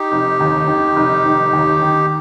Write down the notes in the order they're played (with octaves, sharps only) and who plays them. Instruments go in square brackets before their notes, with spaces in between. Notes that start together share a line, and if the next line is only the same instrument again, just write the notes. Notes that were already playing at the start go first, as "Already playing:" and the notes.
Already playing: [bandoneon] D#4 G4
[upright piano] F1
D#2
D#3
F1
F1
D#2
D#3